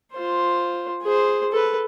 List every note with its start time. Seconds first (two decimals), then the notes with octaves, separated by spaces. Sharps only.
0.13 F4 C5
1.03 G#4 C5
1.52 A4 B4